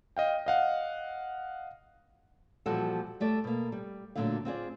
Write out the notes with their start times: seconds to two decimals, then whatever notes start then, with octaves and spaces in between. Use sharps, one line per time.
0.17 D#5 F5 G5
0.46 D#5 F5 F#5
2.66 A#2 E3 F3 G3 F#4 A4
3.20 G3 A3 A4 D5
3.44 B2 A#3
3.72 G3
4.15 A#2 D3 E3 F#3 A3 F5
4.45 C4 F4 G#4 D5